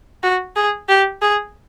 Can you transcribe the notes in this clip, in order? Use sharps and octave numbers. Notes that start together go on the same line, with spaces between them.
F#4
G#4
G4
G#4